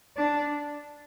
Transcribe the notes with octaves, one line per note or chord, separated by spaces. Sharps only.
D4